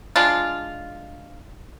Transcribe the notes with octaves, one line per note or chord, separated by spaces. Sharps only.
G#3 D4 F4